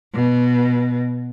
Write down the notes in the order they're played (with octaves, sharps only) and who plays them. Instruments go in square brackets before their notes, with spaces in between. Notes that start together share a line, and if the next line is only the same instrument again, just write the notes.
[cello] B2